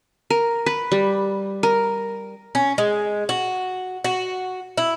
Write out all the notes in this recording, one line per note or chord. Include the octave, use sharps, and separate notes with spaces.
A#4
B4
G3
A#4
C#4
G#3
F#4
F#4
E4